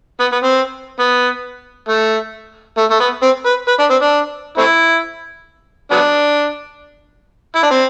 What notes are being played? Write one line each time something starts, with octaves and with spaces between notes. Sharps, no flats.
B3
B3
C4
B3
A3
A3
A3
B3
C4
B4
B4
D4
C4
D4
A3 C4 E4
F#3 B3 D4
E4
D4
C4